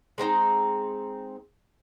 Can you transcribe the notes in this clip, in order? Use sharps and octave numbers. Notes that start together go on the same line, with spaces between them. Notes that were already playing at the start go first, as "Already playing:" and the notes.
G#3 C4 D#4 A#5